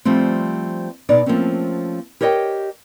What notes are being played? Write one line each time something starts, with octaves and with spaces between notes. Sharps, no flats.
F3 G3 A3 C4
B2 B3 D#4 D5
F3 A3 A#3 C4 C#4
G4 A#4 C#5 D#5 F5 G5